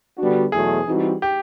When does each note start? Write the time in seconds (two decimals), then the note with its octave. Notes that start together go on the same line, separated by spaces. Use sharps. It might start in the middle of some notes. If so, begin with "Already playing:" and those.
0.18 D3 G3 B3 D4 F#4
0.52 E2 B2 F#3 A3 G#4
0.87 E3 G3 C4 D#4 F#4
1.22 G4